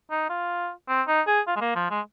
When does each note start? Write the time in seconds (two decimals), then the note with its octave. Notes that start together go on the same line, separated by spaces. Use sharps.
0.11 D#4
0.30 F4
0.89 C4
1.08 D#4
1.27 G#4
1.47 F4
1.56 G#3
1.61 A#3
1.75 F3
1.90 G#3